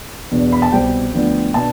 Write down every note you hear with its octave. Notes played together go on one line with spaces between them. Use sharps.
E2 B2 B3 D4
B5
A5
C2 B2 G3 C4 G5
D2 D3 F3 B3 D4
B2 B3 D4 A5